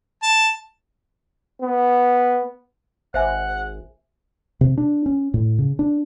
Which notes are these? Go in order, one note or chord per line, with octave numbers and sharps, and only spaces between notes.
A5
B3
G#1 C5 E5 F#5 G#5
C3
D4
C#4
A2
C#3
D4